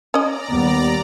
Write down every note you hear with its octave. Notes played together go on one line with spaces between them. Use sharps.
C#4 D5 D#5 A#5
D#2 G3 B3